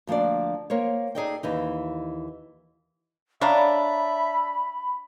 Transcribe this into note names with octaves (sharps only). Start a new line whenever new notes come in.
D2 F3 A#3 D4 D5
A#3 A#4 C5 C#5
D#4 G#4 A4 D5 D#5 G5
D#2 E3 D#4
D4 C#5 E5 F5 A#5 B5